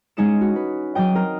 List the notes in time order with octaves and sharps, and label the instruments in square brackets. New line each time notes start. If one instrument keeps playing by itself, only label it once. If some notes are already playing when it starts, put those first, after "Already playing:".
[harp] G#3 C#4 D#4 D#5 C#7 E7
F#4
B4
F#3 D#4 D#5 G5
C4 A#4